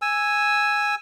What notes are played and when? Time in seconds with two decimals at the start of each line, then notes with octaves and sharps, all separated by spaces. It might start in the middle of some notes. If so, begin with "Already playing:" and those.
0.02 G#5 E6